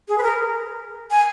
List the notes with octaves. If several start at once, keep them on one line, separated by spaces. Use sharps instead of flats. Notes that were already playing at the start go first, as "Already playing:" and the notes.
G#4
B4
A#4
G#5